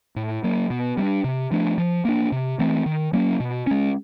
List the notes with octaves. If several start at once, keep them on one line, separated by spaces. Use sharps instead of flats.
A2
F#3 A#3
B2
G3 B3 D4
C3
F3 A3 D4
F3
A#3 D4
C3
E3 A3 C4
D#3
F#3 A#3 C#4
B2
G#3 C#4